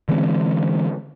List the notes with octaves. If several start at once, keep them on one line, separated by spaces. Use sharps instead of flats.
D3 E3 G#3 C4